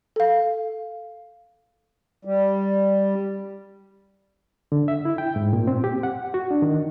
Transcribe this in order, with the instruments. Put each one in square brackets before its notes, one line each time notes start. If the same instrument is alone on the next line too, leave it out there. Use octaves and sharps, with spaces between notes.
[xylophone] A4 F5
[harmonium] G3
[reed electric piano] D3
E5
E4
G5
G#2
A#2
C4
G4
F#5
F#4
D4
D#3